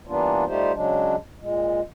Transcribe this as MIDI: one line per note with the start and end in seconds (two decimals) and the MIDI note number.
0.07 0.45 52
0.07 0.45 55
0.07 0.45 58
0.07 0.45 59
0.07 0.45 62
0.07 0.45 65
0.46 0.72 55
0.46 0.72 57
0.46 0.72 63
0.46 0.72 65
0.46 0.72 67
0.46 0.72 72
0.73 1.16 49
0.73 1.16 54
0.73 1.16 56
0.73 1.16 62
1.41 1.81 46
1.41 1.81 56